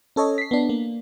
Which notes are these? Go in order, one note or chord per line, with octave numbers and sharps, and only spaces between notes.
C#4 A4 C#5 D#5
B6 C7
B3 D4
A#3